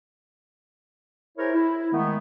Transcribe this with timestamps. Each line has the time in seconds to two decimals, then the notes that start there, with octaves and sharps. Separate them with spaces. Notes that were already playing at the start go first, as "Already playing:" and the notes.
1.38 E4 G#4 A#4 C5 C#5
1.53 E4
1.92 D#3 G#3 A3 B3